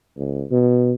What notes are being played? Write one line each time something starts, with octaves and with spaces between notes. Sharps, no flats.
C#2
B2